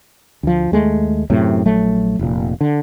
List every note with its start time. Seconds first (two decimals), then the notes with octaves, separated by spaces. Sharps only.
0.43 D2 F3
0.72 D#2 G#3 A3
1.30 F#2 A2 C3
1.66 A#1 F#3 A3
2.19 F1 A#2
2.61 D3